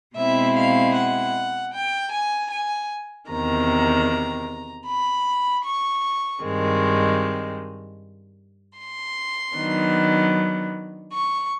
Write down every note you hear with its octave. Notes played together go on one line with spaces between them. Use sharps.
B2 G#3 C4 E4 E5
F5
F#5
G5
G#5
G#5
E2 C3 D#3 A#5
B5
C#6
G2 D#3 G#3 C4
C6
D#3 F#3 B3 D4
C#6